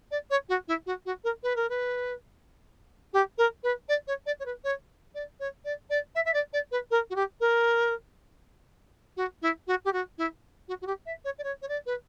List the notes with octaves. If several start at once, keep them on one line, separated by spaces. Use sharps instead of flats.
D5
C#5
F#4
E4
F#4
F#4
A#4
B4
A#4
B4
G4
A#4
B4
D5
C#5
D5
C#5
B4
C#5
D5
C#5
D5
D5
E5
E5
D5
D5
B4
A#4
F#4
G4
A#4
F#4
E4
F#4
G4
F#4
E4
F#4
F#4
G4
E5
C#5
D5
C#5
C#5
D5
B4